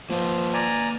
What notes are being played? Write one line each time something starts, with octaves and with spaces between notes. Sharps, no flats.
F3 A#3 B4 D#5
D5 G#5 A#5